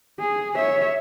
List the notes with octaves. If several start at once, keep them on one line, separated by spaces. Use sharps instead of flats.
G#4
C#5 E5